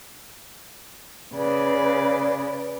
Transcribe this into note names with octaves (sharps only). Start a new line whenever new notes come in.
C#3 B4 D5